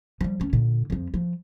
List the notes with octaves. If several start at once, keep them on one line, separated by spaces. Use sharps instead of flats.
F3 G3
D2 C#4
A#2 D3
F2 F3
F3